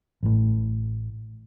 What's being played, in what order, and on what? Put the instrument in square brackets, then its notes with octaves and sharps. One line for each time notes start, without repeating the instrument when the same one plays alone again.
[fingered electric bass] A1 A2